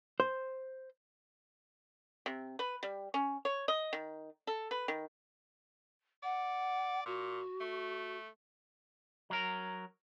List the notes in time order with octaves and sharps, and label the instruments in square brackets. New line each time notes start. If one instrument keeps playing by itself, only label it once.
[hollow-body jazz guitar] C5
[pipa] C3
B4
G3
C#4
C#5
D#5
D#3
A4
B4
D#3
[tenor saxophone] D5 [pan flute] F#5
[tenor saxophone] A#2 [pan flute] F#4
[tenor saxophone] A3
[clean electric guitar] F#3 A#4